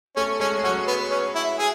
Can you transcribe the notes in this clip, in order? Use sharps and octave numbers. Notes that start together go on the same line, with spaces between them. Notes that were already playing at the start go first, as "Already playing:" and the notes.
A3 C#4 A4
G#3 C#4 G#4
G#4
F#3 C#4 F#4
B3
C#4
E4
G#4